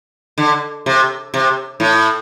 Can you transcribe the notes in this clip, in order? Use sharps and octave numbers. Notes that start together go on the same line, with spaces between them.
D3
C3
C3
A2